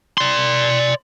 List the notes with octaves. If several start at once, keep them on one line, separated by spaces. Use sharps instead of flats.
D5 C6